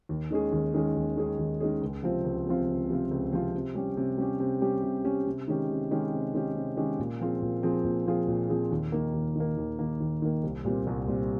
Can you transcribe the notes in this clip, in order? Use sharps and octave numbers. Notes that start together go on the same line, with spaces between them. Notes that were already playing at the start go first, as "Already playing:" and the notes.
D#2
D#3 G#3 C#4 G#4
D#2
D#3 G#3 C#4 G#4
D#2
D#3 G#3 C#4 G#4
D#2
D#3 G#3 C#4 G#4
C#2
C3 F3 C4 F4
C#2
C3 F3 C4 F4
C#2
C3 F3 C4 F4
C#2
C3 F3 C4 F4
C3
G3 C#4 G4
C3
G3 C#4 G4
C3
G3 C#4 G4
C3
G3 C#4 G4
C3
D#3 G#3 C#4 G4
C3
D#3 G#3 C#4 G4
C3
D#3 G#3 C#4 G4
C3
D#3 G#3 C#4 G4
A#2
F3 C4 F4 G#4
A#2
F3 C4 F4 G#4
A#2
F3 C4 F4 G#4
A#2
F3 C4 F4 G#4
D#2
D#3 A#3
D#2
D#3 A#3
D#2
D#3 A#3
D#2
D#3 A#3
C2
A#2 G3 C4
C2
A#2 G3 C4